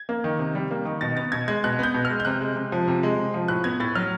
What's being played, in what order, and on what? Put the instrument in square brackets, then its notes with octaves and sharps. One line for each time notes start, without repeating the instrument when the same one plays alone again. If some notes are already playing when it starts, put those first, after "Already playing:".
Already playing: [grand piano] G#6
A#3
D#3
C3
G3
A#3
D#3
B2 A6
B3 A6
B2 G#6
G#3 G#6
B2 F#6
B3 G6
B2
F6
G#3
G6
C3 F#6
G#3
C3
F3
C3
G#3
C3
F3
A2 F#6
B3 G#6
A2 A6
F#3 F6